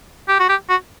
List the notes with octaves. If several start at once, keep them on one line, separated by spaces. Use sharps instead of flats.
G4
F#4
G4
F#4